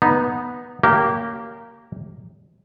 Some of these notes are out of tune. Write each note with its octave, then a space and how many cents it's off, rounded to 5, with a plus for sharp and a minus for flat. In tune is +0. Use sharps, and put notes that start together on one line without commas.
B3 -10 D#4 +0
A#3 -10 C#4 +10 G4 -30